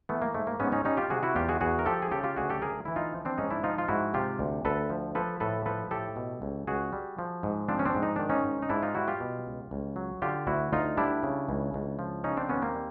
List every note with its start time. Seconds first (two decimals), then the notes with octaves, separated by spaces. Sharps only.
0.09 E3 A3 B3
0.22 A#3
0.34 G#2 A3
0.47 A#3
0.60 G#2 B3 C#4
0.72 C#4 D#4
0.85 G3 C#4 D#4
0.97 F4 G4
1.10 C3 F#4 G#4
1.23 E4 F#4
1.35 E2 F4 G4
1.49 F#4 G#4
1.61 E2 F#4 G#4
1.79 A#4
1.86 F3 G4 A4
2.02 G#4
2.11 C#3 G4 A4
2.24 F4 G4
2.36 D2 F#4 G#4
2.50 G4 A4
2.62 D2 G#4 A#4
2.85 E3 E4
2.96 D#4 F4
3.13 F3
3.25 C4 D4
3.38 G#2 C#4 D#4
3.50 D4 E4
3.63 F3 D#4 F4
3.78 F4
3.88 G#2 E4 F#4
4.14 C3 F4 G4
4.39 D2
4.65 D2 A4 B4
4.90 F3
5.15 F3 A4 B4
5.40 A2 A4 B4
5.66 F3 A4 B4
5.91 A2 G4 A4
6.16 B2
6.42 C#2
6.67 C#2 F#4 G#4
6.93 G3
7.19 F3
7.43 G#2
7.69 F3 C4 D4
7.79 C#4
7.86 C4 D4
7.95 G#2
8.03 D#4
8.16 D#3 D4
8.29 C#4 D#4
8.44 G#2
8.62 D#4
8.69 G#2 D4 E4
8.83 D#4 F4
8.95 G3 E4 F#4
9.08 F4 G4
9.20 B2
9.46 C#2
9.71 C#2
9.96 F#3
10.22 D3 F4 G4
10.47 D2 E4 F#4
10.72 D2 D#4 F4
10.97 G3 D4 E4
11.23 C#3
11.49 C#2
11.74 C#2
11.99 F3
12.24 C#3 C#4 D#4
12.37 C4 D4
12.49 D#2 B3 C#4
12.62 A#3 C4
12.75 G3